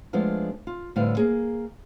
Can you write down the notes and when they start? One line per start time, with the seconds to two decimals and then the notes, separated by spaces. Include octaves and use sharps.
0.13 F3 G#3 A3 B3 D4 F4
0.67 F4
0.96 A2 D3 G3 B3 C5 F5
1.17 A#3 G#4